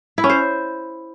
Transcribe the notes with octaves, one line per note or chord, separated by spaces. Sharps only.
E4
C#4
C5